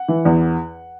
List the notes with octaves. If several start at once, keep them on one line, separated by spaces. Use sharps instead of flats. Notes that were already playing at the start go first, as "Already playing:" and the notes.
Already playing: F#5
E3
E2